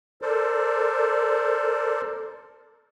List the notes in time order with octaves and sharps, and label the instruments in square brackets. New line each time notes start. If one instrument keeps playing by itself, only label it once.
[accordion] A4 A#4 C5 D5